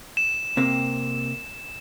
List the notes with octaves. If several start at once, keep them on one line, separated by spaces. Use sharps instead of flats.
E7
C3 A#3 C4